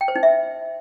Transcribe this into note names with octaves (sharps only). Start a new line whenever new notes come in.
G5
C5
D#4
E5